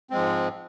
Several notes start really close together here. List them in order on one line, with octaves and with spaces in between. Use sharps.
C4 G#3 F3 G#2